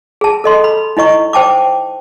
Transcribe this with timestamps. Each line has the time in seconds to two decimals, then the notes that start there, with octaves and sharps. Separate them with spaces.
0.21 G#4 A5
0.44 A4 D#5 C6
0.64 B5
0.97 D#4 E4 D#5 C#6
1.33 C5 G5 A5 D6